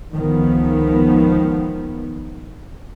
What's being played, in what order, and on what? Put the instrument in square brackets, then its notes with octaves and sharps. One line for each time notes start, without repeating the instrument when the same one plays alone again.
[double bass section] C#2 D#3 F3 B3